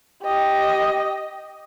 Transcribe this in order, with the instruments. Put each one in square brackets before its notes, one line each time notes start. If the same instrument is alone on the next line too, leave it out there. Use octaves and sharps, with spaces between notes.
[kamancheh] G4 D#5